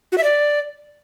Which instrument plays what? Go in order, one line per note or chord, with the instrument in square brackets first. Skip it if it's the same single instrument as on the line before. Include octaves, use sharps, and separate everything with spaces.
[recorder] F#4
E5
D5